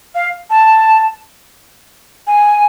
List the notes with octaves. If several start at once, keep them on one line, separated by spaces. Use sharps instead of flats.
F5
A5
G#5